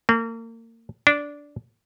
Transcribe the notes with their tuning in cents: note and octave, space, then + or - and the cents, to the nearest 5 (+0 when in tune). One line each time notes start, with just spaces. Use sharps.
A#3 -35
D4 -10